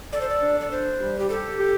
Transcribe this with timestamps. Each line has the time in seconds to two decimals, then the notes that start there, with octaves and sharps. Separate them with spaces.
0.13 A4 D5
0.21 C5
0.30 D5
0.42 D4
0.60 D5
0.71 D4 C5
1.00 G3
1.18 G4
1.30 G4 A4
1.58 G4